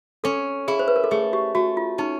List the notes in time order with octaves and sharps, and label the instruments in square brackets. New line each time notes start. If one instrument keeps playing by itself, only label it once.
[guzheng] C#4 [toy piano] A4
[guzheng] E4 [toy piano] G#4
[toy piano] C5
B4
A#4
A4
[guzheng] A3 [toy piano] G#4
[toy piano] G4
[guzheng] A3 [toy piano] F#4
[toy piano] F4
[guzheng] C#4 [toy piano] D#4